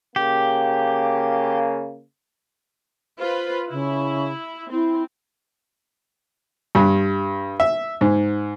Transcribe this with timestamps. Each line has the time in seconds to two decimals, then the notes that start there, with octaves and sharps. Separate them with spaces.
0.16 C#3 A#3 G4
3.19 F4 B4 C5
3.70 C#3 E4
4.72 C4 E4
6.75 G2
7.60 E5
8.01 G#2